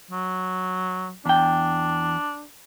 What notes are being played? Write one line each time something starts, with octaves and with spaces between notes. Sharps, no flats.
F#3
E2 D4 G5